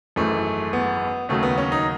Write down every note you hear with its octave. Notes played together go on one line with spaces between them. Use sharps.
G#1 F#2 E3 G#3 A3
B3
D#2 C#3 F#3 A3
B3
C#4
D#4